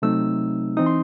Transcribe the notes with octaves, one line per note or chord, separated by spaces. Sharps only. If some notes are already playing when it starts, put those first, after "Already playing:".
C3 F#3 A3 C4 D#4 E6
E3 C4 D#4 D#6
C6